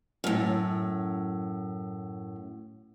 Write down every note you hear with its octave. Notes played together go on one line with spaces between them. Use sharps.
F#2 A2